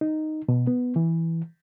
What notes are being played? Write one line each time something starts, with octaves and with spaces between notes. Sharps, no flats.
D#4
B2
B3
E3